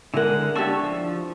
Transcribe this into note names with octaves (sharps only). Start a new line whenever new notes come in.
D3 G#3 E4 A#4 F#5
D4 E4 G4 A5 C#6 E6
F3